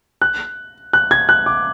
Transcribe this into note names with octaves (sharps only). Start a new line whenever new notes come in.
F#6
F#6
G#6
F#6
D6